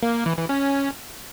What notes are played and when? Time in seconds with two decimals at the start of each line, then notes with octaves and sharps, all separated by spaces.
0.03 A#3
0.14 A#3
0.26 E3
0.38 E3
0.49 C#4